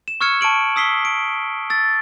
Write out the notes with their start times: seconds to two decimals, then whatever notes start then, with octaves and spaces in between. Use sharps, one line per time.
0.08 E7
0.21 C#6 E6 F6 G#6 C#7 E7
0.41 A5 C#6 D7 F#7
0.76 D#6 E6 B6 C7 G7
1.05 D7
1.70 E6 A6